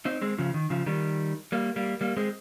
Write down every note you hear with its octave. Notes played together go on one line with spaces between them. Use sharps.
C4 D#4
G#3 C4
C#3 F3
D#3
C#3 F3
D#3 G3
G3 A#3
G3 A#3
G3 A#3
G#3 C4